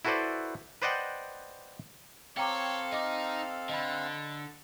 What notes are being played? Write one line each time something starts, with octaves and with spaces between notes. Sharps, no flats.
E4 F#4 A4 B4 C5 D5
B4 C5 D5 D#5 F#5 G5
C4 A4 C#5 F5 G5 A#5 D6
D#4 A4 D#5 D6 F6
D3 D#5 B5